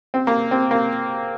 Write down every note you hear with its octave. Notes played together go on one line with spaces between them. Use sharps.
C4
A#3
C4
A#3